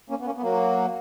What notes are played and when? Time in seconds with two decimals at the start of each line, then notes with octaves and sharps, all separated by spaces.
0.10 A#3 C#4
0.20 B3
0.26 A#3 C#4
0.36 B3
0.42 F#3 A#3